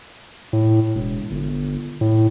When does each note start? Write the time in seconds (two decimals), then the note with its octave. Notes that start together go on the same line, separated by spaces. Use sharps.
0.53 A2
0.95 E1
1.31 G1
2.01 A2